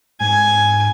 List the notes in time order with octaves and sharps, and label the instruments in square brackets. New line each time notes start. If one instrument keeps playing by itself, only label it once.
[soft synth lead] G#2 [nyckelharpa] G#5